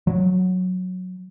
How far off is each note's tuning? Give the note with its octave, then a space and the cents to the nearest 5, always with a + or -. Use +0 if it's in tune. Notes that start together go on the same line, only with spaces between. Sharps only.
F#3 -10